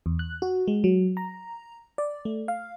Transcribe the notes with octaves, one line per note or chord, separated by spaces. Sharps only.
E2
F#6
F#4
G#3
F#3
A#5
D5
A3
F5